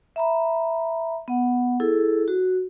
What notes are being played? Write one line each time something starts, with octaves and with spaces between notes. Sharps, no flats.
E5 A#5 B5
B3 F#5
E4 G#4 A4
F#4